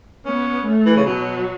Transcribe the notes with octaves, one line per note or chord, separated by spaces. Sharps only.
B3 C#4
A3
E3
C#3
B2 F#3